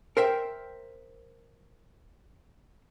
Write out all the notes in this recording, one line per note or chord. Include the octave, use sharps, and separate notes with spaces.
A#4 C5 E5 G5